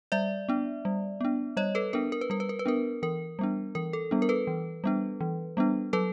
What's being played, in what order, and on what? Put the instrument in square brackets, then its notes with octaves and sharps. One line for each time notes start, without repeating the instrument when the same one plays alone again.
[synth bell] G3 D5 E5
B3 D4
G3
B3 D4
G3 C#5 D#5
A4 B4
B3 D4 A#4
A#4
B4
G3 A#4
B4
A#4
B4
B3 D4 A#4
E3 A#4
G3 B3 D4
E3 A#4
A4
G3 B3 D4
A#4
A4 B4
E3
G3 B3 D4
E3
G3 B3 D4
F#3 A4 B4